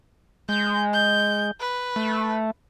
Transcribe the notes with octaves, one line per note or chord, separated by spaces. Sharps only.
G#3 G6
G6
B4
A3